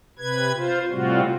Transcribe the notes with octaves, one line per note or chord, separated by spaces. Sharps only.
C3 B4 G#6
F4 C5
A2 C3 G3 C4 F4 F#4